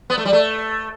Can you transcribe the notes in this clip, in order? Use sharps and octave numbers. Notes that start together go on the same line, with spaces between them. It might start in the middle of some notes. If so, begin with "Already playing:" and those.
B3
A3
G3
A3